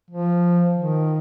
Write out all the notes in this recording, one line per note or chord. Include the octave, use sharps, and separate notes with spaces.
F3
D#3